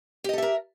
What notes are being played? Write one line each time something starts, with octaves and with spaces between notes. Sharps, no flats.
G4 A4 A#4 D#5 E5